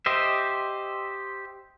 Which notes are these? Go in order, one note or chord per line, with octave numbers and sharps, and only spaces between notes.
G4 C5 D#5 E5